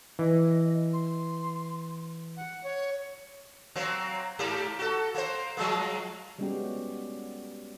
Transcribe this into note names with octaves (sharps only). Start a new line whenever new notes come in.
E3 D#5
C6
F#5
C#5
F#3 A#3 C4
G#2 A#3 G4
F#4 A4
A#3 C5
F3 G#3 A#3
G3 G#3 B3 C#4 F#4 G4